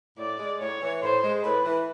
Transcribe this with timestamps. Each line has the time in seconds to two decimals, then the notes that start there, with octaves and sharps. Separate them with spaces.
0.18 A2 D5
0.39 G#3
0.60 A2 C#5
0.81 E3
1.02 A2 C5
1.23 G#3
1.43 A2 B4
1.65 E3